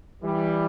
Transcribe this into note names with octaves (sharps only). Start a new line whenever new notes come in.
E3 G3